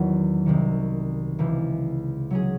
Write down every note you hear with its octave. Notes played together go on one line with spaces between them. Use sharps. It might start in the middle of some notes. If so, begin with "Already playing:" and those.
Already playing: E2 D#3 F#3 C#4 F#4
C2 C3 D#3
C#2 C3 E3
F#3 C#4 G#4